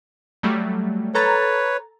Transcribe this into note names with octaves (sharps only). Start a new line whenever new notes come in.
F#3 G3 A3
A4 B4 C#5 A#5 A6